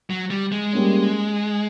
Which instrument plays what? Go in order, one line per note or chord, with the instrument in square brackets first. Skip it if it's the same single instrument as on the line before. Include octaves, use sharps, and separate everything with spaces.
[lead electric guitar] F#3
G3
G#3
[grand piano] G3 A#3 C#4